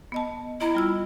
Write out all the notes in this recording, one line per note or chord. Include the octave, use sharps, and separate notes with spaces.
B3 D#5 A5
E4 D#5 A#5
G3 F4 E6